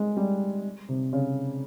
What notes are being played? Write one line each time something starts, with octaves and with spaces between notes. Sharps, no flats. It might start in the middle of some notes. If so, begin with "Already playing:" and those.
Already playing: G#3
G3
C3
C#3